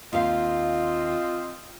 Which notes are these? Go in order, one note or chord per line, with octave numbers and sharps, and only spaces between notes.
D#2 C4 F4 D#5 F5